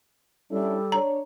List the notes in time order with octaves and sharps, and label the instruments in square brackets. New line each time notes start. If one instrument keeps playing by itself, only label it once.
[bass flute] G3 [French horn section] C#4 D4 E4 [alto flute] A4
[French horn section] D4 C#5 [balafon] A#5